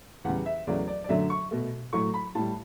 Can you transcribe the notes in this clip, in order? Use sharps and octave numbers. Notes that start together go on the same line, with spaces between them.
E2 C#3 G3 F#5
E5
E2 C#3 F#3 A3 D5
D5
D5
F#2 D3 F#3 A3 E5
C#6
B2 A3
A2 F#3 A3 C#6
B5
A2 G3 A5